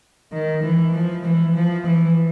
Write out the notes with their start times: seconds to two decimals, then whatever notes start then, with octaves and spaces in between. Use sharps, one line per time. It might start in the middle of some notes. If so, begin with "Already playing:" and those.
0.33 D#3
0.62 E3
0.94 F3
1.24 E3
1.55 F3
1.86 E3